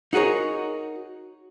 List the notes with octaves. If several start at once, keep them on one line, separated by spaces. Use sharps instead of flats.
D#4 F#4 G#4 A#4 C#5